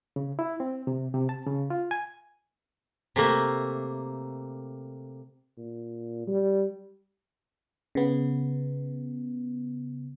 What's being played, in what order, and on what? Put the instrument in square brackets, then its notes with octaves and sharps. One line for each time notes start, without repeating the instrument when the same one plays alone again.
[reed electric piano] C#3
E4
C4
C3
C3
A5
C#3
F4
G#5
[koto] C3 A3 A#3
[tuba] A#2
G3
[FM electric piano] C#3 B3